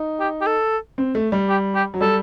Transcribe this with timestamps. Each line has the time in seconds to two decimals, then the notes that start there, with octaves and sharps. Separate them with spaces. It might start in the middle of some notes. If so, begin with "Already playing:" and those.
Already playing: D#4
0.20 G4
0.41 G4
0.46 A4
0.98 C4
1.15 A3
1.32 G3
1.49 G4
1.75 G4
1.94 F#3
2.01 G3 A4